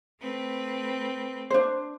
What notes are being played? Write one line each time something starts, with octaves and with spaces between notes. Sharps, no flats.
A3 C4 B4
D4 C5